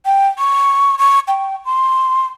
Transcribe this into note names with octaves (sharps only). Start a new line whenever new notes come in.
G5
C#6
C#6
G5
C6